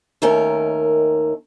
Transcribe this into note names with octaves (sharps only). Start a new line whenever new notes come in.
D#2 D#3 A3 C#4 A#4